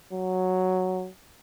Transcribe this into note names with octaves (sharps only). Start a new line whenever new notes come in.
F#3